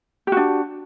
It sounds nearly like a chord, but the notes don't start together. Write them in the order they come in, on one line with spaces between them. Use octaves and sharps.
G4 F#4 D4